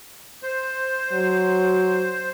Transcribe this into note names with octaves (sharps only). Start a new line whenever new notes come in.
C5
F#3